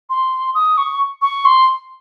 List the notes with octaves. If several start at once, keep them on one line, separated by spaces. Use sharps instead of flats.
C6
D#6
C#6
C#6
C6